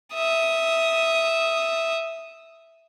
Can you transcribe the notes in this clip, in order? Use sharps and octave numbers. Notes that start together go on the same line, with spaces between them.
E5 D#6